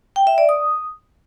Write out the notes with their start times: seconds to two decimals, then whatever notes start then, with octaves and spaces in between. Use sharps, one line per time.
0.16 G5
0.27 E5
0.38 D5
0.49 D#6